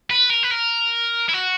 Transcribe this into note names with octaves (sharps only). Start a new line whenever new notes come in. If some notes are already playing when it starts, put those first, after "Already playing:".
B4
A#4
B4
A#4
E4
F#4